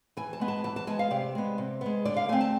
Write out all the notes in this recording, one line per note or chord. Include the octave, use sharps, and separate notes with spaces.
E3 G#5
A5
G#3 B3
A5
E3 A5
A5
G#3 B3 G#5
F5
C3 D5
G#3 B3
C3
G#3 B3
D3 D5
F5
A3 C4 G#5
A5